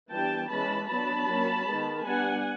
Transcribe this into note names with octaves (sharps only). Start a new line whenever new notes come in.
E3 G3 B3 D4 G5 A5
E3 G#3 C#4 A5 B5
F#3 B3 D4 A5 B5
F#3 A#3 C#4
D#3 G#3 B3
G3 B3 D4 F#5 G#5